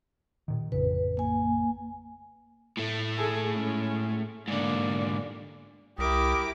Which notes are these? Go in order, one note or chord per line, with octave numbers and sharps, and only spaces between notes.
A#2 D#3
A1 F2 C#3 B4
A#3 G#5
A2 A3
G#4 A4
G#3 C#4
G#2 D3 A#3 D5
C2 E4 G4 A#4 D6 D#6